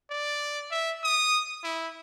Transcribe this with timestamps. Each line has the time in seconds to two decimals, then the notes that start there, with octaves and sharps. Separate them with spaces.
0.10 D5
0.71 E5
1.04 D#6
1.64 E4